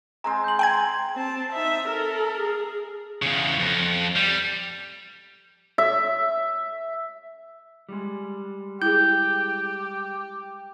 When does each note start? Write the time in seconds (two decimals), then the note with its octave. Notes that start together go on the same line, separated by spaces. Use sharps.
0.24 G#3 C4 C5 G#5 A#5
0.44 G6 F#7
0.59 G5 G#5 C6 G#6
1.16 C4 A5
1.53 D#4 E5
1.88 A4 A#4
2.41 G#4
3.22 E2 C#3
3.59 F2
4.16 G3
5.78 E5
7.89 G3 G#3
8.82 E4 G4 G#4 G6